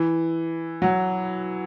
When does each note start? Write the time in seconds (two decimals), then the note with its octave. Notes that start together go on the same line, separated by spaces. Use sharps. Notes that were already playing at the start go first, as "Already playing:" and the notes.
Already playing: E3
0.82 F#3